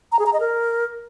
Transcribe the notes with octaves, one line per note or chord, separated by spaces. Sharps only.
A#5
G#4
A#5
D#5
A#4